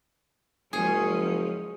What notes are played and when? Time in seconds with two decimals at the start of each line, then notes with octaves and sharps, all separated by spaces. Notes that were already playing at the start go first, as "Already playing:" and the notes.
0.73 F#1 F3 G#3 C#4 G#4